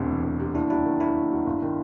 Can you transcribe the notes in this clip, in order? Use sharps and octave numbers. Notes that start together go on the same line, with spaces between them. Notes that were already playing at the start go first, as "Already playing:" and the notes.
Already playing: E1 D2 C3 C4 D4
E3
E1
C3
D#2 D4 E4
F#3 D4 E4
D#3
D#2 D4 E4
D#2
F#3
G1
D#3